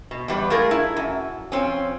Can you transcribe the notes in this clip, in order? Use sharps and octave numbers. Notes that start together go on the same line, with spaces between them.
B2
E2 G3 B4
A3 F4 G#4 A#4
E4
F#2
F3 C4 C#4